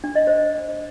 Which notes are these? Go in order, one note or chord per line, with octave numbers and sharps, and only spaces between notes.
D4
D#5
C5